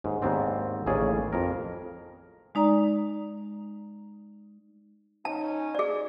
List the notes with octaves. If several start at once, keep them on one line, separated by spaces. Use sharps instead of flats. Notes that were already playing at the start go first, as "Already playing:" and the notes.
D#2 G#2
D#2 G#2 B3 C4 D4
A1 D#2 C#3 C#4 G#4 D5
F2 A#4
G#3 D#4 D5 A#5
C#4 D#4 A5
G#4 D5